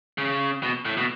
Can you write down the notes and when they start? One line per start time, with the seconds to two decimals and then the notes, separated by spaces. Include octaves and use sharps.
0.18 C#3
0.63 B2
0.85 A2
0.98 B2